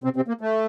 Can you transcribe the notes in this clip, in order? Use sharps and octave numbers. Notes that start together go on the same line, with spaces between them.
C3 C4
C3 C4
A#3
A3